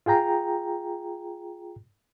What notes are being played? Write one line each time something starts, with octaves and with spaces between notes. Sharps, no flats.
F4 G#4 G5 A#5